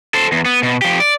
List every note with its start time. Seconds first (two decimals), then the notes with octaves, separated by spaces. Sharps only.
0.14 A4 C5
0.32 E2
0.45 B3
0.63 B2
0.82 F3 G4
1.00 D5